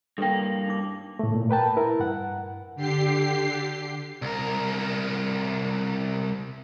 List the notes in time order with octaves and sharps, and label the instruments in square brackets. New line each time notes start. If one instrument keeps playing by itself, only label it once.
[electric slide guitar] G2 A#3 [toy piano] A4 B4 G5
[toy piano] D#4 D6
[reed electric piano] A2 A3
A#2
A#4 B4 G5 A5
E4 A#4 B4
G2 F#5
[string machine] D3 G4 C7
[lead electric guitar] C2 A#4